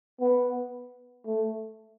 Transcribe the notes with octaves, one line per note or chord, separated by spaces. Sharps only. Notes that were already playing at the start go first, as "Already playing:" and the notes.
B3
A3